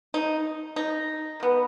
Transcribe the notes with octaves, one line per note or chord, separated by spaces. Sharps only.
D#4
D#4
D#3 B3